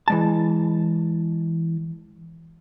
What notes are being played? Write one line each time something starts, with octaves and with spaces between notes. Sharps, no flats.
E3 G#3 A5